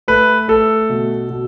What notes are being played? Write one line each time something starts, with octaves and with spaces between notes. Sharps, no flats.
A3 B4
A3 A4
B2
B2